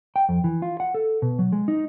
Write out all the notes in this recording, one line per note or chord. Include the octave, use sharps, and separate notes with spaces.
G5
F2
E3
F4
F#5
A4
B2
F#3
G#3
D#4